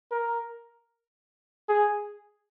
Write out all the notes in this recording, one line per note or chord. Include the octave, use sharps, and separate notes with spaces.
A#4
G#4